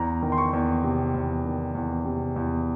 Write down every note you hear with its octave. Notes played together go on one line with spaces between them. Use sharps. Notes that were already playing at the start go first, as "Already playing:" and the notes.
Already playing: E2 A#5
D#3
C6
C#6
E2
C3
E2
D#3
E2
C3
E2